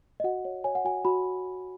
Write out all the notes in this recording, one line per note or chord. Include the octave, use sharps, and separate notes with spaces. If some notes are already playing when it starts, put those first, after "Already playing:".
D#5
F#4 F#5
C#5
C#5 G#5
F#5
F#4 G#5
F#4 B5